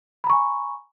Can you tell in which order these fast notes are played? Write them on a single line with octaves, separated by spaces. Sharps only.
B5 A#5 C#6 G#5